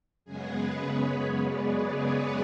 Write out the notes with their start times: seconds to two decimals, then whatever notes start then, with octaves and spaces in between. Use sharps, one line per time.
0.25 F#2 C#3 G#3 B3 G#4
0.54 B4
0.85 C#5
1.44 D5
2.03 C#5